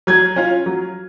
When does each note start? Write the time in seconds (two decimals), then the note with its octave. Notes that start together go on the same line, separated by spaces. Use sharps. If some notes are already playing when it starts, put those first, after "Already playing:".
0.07 F#3 G#6
0.36 C#4 F4
0.66 F#3